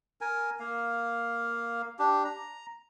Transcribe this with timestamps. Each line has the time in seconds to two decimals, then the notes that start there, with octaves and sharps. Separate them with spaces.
0.21 A#4 G#5
0.60 A#3 F5
1.99 D4 G4
2.25 A#5